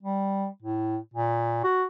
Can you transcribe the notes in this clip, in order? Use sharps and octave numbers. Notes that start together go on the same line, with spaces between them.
G3
A2
A#2
F#4